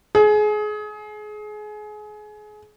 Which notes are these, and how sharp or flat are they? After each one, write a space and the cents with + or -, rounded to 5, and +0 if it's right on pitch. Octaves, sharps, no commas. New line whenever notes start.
G#4 +25